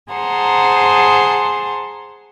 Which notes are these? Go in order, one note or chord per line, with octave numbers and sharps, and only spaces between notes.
G#4 C5 F#5 A5 A#5 C6